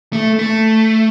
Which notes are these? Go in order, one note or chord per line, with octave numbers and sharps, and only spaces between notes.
A3
A3